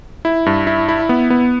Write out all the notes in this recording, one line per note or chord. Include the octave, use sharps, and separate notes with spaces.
E4
G2
E4
E4
B3
B3